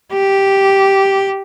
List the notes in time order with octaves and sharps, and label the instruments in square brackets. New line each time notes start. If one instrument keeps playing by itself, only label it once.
[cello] G4